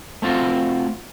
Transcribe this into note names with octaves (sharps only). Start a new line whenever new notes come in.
A3 C4 F4 F#4